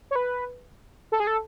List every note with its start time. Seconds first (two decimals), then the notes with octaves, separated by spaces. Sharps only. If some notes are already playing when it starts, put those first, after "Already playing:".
0.11 C#5
0.16 B4
1.12 A4
1.20 G#4
1.27 A4